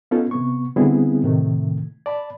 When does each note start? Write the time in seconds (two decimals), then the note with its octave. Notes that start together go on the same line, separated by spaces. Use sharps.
0.11 B3 C#4 D#4 F4 A4
0.31 C3 B3 C#6
0.76 D3 G3 B3 C4 E4 G#4
1.23 A2 C3 D#3 A3
2.06 D5 A5 B5